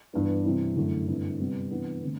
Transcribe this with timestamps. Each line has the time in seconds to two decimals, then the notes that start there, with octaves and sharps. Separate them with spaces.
0.13 G2 E3 B3 D4
0.44 C3 E3 G3 C4 E4
0.76 F#2 D3 A3 E4
1.07 G2 D3 A3 C4 E4
1.39 C3 G3 B3
1.70 C3 E3 B3 D4
2.02 D3 A3 C4